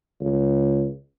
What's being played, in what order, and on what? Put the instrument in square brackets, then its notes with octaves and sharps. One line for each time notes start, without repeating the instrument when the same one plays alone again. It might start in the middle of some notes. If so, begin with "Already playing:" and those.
[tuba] C#2